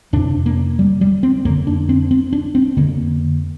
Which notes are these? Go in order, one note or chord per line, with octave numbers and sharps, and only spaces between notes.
F2 C3 D4
A#3
G3
G3
C4
F2 D3 A#3
D4
C4
C4
D4
C4
F2 D3 A#3